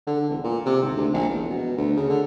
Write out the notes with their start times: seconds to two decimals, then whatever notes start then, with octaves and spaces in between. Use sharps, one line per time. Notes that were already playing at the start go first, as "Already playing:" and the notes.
0.07 D3
0.29 E1
0.44 A#2
0.66 C3
0.82 G#1
0.96 D2
1.14 A#1
1.28 E1
1.49 B2
1.77 D2
1.96 C#3
2.09 D3